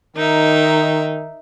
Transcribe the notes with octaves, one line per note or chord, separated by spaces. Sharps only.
D#3 D#4 A#4 E5